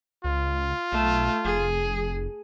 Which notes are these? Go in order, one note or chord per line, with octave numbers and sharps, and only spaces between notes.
C#2 F4
B1 A3
F1 G#4